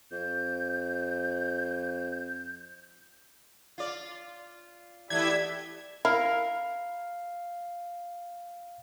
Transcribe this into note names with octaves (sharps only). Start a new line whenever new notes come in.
F2 G6
F4 D5
E3 A3 B3 E4 G4 D5 E5 G#6
E4 A#4 F5